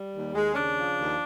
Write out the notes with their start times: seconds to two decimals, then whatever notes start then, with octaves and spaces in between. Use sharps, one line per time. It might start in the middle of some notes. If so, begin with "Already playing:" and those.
Already playing: G3
0.14 D#2
0.35 D#2 G#3
0.52 C#4
0.56 C#3 D4
0.77 F3
0.98 D#2